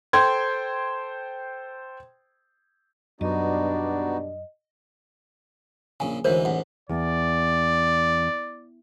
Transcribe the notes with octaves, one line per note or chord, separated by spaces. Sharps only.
A4 C5 G5 C6 G#6
F#2 B2 G3 B3 D4 D#4 F#4 D#5
A#1 C#3 G#5
D2 G#2 E3 A#4 C5 C#5
A1 G#2 F#5
E2 D5